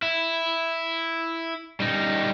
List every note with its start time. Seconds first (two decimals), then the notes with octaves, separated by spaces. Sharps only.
0.03 E4
1.80 G3 D#4